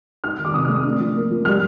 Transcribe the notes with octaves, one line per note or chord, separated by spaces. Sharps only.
D#4 F6
D#3
D6
C3 D#6
F6
A3
D#6
D4
F3
A#3
F3
G3 F6